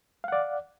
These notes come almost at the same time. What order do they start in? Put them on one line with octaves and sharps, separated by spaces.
F5 F#5 D5